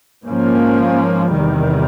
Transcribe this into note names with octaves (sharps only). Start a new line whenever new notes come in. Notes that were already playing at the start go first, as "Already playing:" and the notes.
G#2 F3 A#3 C#4
E2 C3 D#3 G3